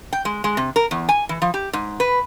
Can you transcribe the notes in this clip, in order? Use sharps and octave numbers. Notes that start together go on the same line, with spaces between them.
G5
G#3
G#3
C3
A#4
E2
G#5
E3
F3
G4
G#2
B4